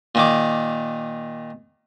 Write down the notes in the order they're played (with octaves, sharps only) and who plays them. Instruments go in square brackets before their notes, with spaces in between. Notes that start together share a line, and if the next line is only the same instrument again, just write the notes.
[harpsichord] A#2 D#3 D6